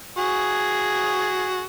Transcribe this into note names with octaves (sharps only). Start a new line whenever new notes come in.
F#4 G#4